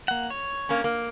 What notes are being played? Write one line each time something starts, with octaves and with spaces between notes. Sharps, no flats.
A#3 F#5
C#5
A#3 C#4
A#3